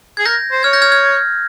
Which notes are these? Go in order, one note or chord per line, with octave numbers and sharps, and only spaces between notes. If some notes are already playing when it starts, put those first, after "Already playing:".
G#4 G#6
A#4 G6 A#6
C5
C#5 F6 G#6
G6 A#6
F6 G#6
F6 G#6